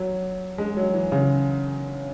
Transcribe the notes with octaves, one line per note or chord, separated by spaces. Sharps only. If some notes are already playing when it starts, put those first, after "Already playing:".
Already playing: F#3
G#3
F#3
E3
C#3